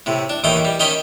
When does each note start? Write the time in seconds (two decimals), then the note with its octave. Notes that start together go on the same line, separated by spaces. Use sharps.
0.06 A2 C3
0.29 D4
0.44 D#2 A2 D#3 E3 G5 D#6
0.65 G3
0.80 D#3 C#4 D#5 G5 B5